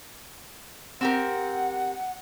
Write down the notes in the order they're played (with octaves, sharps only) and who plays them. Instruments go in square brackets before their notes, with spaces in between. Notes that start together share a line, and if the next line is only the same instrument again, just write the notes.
[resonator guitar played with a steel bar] C4 G4 A#4 [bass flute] F#5